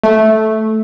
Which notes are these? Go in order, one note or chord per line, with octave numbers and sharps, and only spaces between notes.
A3